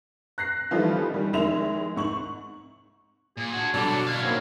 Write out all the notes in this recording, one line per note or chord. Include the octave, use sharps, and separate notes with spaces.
F#6 A#6 C7
E3 F3 G3 A3 D#4 F4
D#3 G3
F1 D#3 G#3 E4 F7
G#2 C#6 F#7
A#2 G#4
D4 F#4
B2 D3 G3 D5 A5
F#3
E4 C#5 F5
F#2 D#3 F#3 A#3 C4